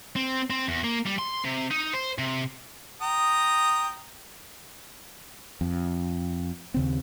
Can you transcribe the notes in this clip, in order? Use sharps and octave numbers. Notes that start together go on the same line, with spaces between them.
C4
C4
E2
A#3
G3
C6
C3
D#4
C5
C3
G5 A#5 D#6
F2
D#2 C#3 C4